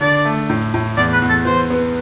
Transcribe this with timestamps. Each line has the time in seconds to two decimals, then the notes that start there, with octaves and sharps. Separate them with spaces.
0.01 D3 D5
0.25 A3
0.50 A2
0.74 A2
0.97 E2 D5
1.13 B4
1.22 E2
1.29 A4
1.45 E3 C5
1.70 B3